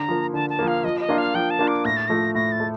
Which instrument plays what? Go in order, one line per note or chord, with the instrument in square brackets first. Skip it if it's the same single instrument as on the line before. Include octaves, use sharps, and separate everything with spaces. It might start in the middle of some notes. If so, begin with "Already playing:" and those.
Already playing: [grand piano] D3 [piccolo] A#5
[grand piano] F3 A#3
[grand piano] D3 [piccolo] A5
[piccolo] A5
[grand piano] F3 A#3
[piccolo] F5
[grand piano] F3 [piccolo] D#5
[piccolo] D#5
[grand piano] A#3 D4 F4
[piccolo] F5
[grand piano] F3 [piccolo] G5
[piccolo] A5
[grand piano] A#3 D4 F4
[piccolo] D6
[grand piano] A2 [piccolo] A#6
[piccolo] A6
[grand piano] F3 A3 [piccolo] A#6
[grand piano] A2 [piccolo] A#6
[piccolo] A6
[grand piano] A3